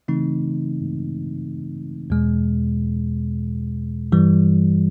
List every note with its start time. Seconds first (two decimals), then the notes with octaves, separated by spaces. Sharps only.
0.08 C#3 E3 A3 C4 D#4
2.10 E2 B2 G#3
4.12 G2 E3 G3